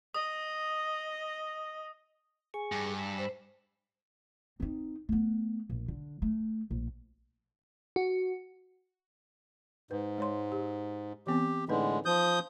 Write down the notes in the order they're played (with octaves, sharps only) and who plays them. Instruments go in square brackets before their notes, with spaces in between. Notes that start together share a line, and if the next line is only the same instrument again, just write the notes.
[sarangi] D#5 [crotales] D#6
[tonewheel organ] G#4 C#6 [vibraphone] G#5
[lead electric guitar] G2
[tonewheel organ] B5 E6
[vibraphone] C5
[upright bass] C4 D#4
A3 B3
A#1
D3
A3
A#1
[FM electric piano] F#4
[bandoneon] G#2 [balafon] B4
[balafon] G#3 C#5 C6
G4
[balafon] E3 B3 C4 [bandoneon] G4
[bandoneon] A2 D3 G#3 [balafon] D#4 B4
[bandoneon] F3 D#6 G6